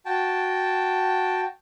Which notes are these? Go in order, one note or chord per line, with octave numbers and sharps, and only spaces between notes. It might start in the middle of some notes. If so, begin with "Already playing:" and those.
F#4 G5 A5